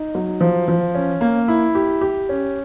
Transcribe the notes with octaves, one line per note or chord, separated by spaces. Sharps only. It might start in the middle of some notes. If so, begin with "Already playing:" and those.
Already playing: D#4
F#3
F3
F3
C#4
A#3
E4
G4
G4
C#4